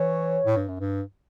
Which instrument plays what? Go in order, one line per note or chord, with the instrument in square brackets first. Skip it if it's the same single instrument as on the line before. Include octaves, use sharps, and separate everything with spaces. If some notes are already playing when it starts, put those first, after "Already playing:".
Already playing: [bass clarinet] E3 [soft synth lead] C#5
[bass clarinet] A2
G2
F#2
G2